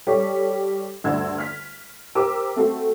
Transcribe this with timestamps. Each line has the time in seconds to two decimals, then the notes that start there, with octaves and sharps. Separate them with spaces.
0.07 G3 G4 A4 C#5
1.04 D2 G2 D5 E6 G#6
1.38 F6 B6
2.15 G4 A#4 C5 D6 E6
2.56 A3 C4 F#4 A4